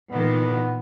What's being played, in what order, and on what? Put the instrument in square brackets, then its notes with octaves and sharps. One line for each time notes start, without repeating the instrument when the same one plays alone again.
[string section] A#2 D#3 E3 [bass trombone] B3